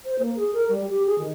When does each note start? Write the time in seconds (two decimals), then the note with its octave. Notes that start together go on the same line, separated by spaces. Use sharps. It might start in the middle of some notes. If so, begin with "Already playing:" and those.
0.05 C5
0.18 A#3
0.36 G#4
0.53 A#4
0.68 G3
0.89 G4
1.05 G#4
1.18 D#3